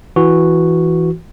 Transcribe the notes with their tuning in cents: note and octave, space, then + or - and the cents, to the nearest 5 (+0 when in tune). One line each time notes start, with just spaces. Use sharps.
E3 +0 F#4 -5